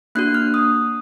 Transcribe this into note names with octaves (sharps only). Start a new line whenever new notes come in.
A#3 D4 F#4 F#6
F6
D#6